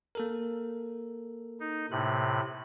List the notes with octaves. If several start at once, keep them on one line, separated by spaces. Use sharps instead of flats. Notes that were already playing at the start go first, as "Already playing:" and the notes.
A#3 A4 A#4
D#4
A2 C3 F#6